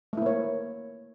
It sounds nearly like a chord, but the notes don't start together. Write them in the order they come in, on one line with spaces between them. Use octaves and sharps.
A3 E4 A#3 C#5